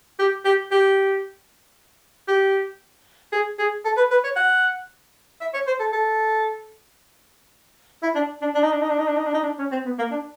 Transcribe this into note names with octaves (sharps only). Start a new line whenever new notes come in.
G4
G4
G4
G4
G#4
G#4
A4
B4
B4
C#5
F#5
E5
C#5
C5
A4
A4
E4
D4
D4
D4
D#4
D4
D#4
D4
D#4
D4
D#4
D4
D#4
D4
C#4
C4
B3
A#3
D4